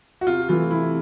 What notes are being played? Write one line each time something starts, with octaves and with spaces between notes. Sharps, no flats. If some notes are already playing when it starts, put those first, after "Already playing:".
F#4
C3 F4
E3 A3 F4
C3 E4